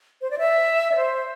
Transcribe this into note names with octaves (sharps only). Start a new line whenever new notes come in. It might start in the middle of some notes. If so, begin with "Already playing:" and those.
C5
D5
E5
D5
C5